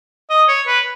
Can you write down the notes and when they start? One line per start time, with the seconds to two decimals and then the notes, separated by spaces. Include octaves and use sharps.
0.30 D#5
0.48 C#5
0.67 B4